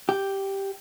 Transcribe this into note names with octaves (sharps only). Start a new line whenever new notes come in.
G4